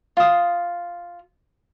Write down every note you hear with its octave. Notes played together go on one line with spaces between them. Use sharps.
F4 D#6